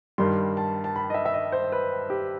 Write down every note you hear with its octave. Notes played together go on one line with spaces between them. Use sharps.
G2 D#3 G3 C6
A5
A5
B5
D#5
E5
E5
D#5
C5
B4
G4